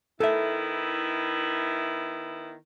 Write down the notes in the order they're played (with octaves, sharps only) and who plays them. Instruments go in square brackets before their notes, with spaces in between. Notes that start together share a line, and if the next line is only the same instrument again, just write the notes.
[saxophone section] D#3 B3 E4 [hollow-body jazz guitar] A4 E5